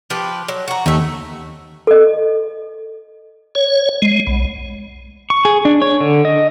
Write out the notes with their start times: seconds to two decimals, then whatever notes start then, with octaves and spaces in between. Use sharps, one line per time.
0.10 F3 G4 B4
0.48 F#3
0.68 F#4 A#5
0.86 D#2 A3 E5
1.87 A4 D#5
3.55 C#5
4.02 G#3
4.27 B1
5.30 C#6
5.45 G#4
5.65 D4
5.82 C#5
6.00 D3
6.25 D#5